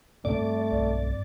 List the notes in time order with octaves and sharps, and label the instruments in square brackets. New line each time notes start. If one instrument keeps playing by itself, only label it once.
[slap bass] G2 C4 [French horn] A3 [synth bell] D5
[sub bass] B1